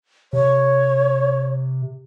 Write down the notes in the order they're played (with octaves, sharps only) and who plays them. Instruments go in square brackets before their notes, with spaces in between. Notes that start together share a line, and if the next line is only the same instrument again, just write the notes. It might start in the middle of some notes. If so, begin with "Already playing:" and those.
[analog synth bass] C3 [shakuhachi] C#5